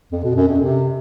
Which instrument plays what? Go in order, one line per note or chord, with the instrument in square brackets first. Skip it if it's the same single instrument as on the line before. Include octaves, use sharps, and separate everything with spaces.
[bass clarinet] F2
B2
F#2
F2
C3